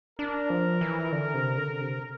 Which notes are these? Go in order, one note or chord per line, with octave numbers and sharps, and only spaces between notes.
D4 A#4
F3
E3
D3
C3
D3
C3